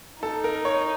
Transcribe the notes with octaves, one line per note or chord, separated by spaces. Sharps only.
D#4 A4
A#4
C#5